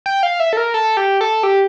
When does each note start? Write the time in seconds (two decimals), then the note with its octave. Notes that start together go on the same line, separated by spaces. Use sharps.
0.06 G5
0.23 F5
0.40 E5
0.53 A4
0.57 A#4
0.74 A4
0.97 G4
1.21 A4
1.43 G4